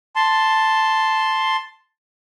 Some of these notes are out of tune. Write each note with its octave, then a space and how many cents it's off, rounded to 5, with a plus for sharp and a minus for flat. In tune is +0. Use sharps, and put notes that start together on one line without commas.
A5 +0 C6 +0